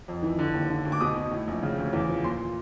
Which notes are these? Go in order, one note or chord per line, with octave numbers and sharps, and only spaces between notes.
F2
E3
D3
D#2
D3
D2
D6
B2 D#6
B2
A2
A#1
C#3
D2
E2
F3
A#2 C6